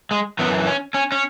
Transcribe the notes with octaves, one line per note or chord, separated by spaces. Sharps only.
G#3
F#2 E3 B3
C#4
C#4
C#4